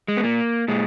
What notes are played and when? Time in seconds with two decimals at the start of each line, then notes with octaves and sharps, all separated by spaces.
0.08 G#3
0.17 B3
0.23 A#2 A#3
0.68 A#2 G#3